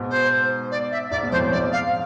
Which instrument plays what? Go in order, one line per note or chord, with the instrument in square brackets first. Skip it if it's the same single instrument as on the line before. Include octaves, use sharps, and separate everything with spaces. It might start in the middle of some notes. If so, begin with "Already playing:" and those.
Already playing: [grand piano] G#2 B2
[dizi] C5
D5
E5
[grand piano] G#2 [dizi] D5
[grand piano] B2
[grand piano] F2 A2 [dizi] C5
[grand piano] F2
[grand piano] G#2 [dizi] D5
[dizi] F5